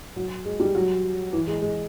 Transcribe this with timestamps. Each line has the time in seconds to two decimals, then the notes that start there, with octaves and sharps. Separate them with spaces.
0.16 F#3
0.45 G#3
0.60 G3
0.75 F#3
1.33 E3
1.47 G#3
1.62 G#3